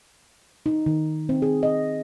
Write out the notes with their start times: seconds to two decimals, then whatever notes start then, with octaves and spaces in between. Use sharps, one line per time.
0.66 D#4
0.86 D#3
1.29 C4
1.42 G#4
1.63 D#5